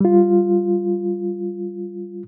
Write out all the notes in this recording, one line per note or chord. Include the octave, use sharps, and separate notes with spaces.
G3 F4